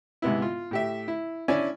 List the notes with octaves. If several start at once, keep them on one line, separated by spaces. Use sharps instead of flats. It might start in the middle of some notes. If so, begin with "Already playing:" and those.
G#2 C3 B3 E4
F4
A2 G4 E5
E4
C#4 D4 E4 D5 G#5